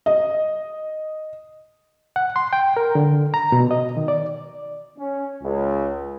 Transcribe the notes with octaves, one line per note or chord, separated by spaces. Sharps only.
D#5
F#5
C6
G5
A#4
D3
A#5
B2
D#5
D#3
D5
C#4
C#2